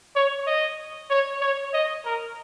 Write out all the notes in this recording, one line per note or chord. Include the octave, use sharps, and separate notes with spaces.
C#5
D#5
C#5
C#5
D#5
A#4